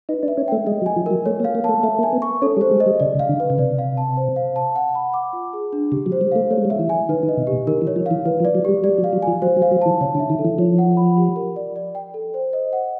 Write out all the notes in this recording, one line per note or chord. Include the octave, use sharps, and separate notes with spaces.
D#4 B4
D4
E5
C#4
A3 G5
G#3 D#5
F#3
G#5
F3
F#3 A#4
A3 C#5
A#3
F5
A#3
A3 A5
A3 E5
A#3
G#5
B3
C#6
C#4 A4
G3
C5
G#3
D#5
G3
C#3 D5
C#3
F5
D3
B4
C#3
C3 D5
F5
A5
C5
F5
A5
F#5
B5
D6
F4
G#4
D4
C#3 G4
F#3
C5
G3
A3 F5
A3 C#5
G#3
G3
G#3 E5
E3
G#5
D#3 B4
D#3
D#5
C3
G4
B2
D#3 A#4
E3
C#5
F3
E3 F5
E3 B4
F3
D5
F#3
G3 G4
G3 D5
F#3
F5
F#3
G#5
F3
F#3 C5
F#3
F5
F#3
E3 A5
C#3 C#5
D3
E5
D#3
A4
E3
F3 C#5
F#5
B5
G4
A#4
D5
D5
G5
A4
C5
D#5
F#5